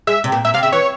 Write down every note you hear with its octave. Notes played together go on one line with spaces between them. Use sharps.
G#3 E5
C3
A#2
A#2 E5
C3 F5
C#3 E5
E3 C#5